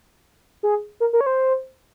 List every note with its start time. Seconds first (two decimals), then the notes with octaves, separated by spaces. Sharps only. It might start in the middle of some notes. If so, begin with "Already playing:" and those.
0.63 G#4
1.00 A#4
1.13 A#4
1.21 C#5
1.26 C5